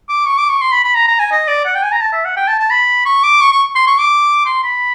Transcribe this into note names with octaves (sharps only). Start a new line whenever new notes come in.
D6
C#6
D6
C#6
C6
B5
B5
A#5
A#5
G#5
D#5
D5
F#5
G5
G#5
A#5
A5
E5
F#5
G5
A5
A5
B5
C#6
D6
C#6
C#6
C6
C#6
D6
C6
B5